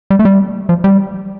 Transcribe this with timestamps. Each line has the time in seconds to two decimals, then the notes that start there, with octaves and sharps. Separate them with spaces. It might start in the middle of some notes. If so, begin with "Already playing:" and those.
0.10 G3
0.19 A3
0.25 G3
0.69 F3
0.84 G3